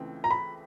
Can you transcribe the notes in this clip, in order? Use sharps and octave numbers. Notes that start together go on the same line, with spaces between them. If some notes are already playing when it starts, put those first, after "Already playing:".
Already playing: C#2 C#3 E3 A3 C4
A#5
B5